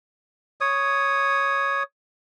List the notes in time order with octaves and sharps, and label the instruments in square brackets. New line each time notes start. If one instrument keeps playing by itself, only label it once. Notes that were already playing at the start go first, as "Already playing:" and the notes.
[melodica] C#5 D#6